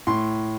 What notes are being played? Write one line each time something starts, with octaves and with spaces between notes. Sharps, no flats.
A2 C6